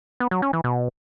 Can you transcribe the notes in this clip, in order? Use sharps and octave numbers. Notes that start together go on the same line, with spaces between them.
B3
F#3
C#4
E3
B2